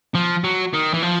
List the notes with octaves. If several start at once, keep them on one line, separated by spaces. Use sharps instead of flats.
F3
F#3
D#3
E3
F3